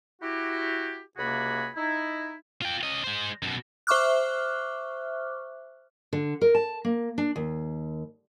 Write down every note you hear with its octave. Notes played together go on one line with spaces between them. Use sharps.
E4 F#4 G4
C#2 C3 A#3 F#4 G#4 B5
D#4 E4
F4 G5
C#4 D#5
G#3 C5
F#2 B2
C5 E5 C#6 D6 F6 F#6
D3
A#4
A5
A#3
D4
D#2